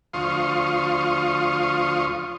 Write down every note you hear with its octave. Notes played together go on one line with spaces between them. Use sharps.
D2 F3 F5 C6 C#6 D#6